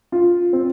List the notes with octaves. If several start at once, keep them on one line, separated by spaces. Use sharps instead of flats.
F4
C4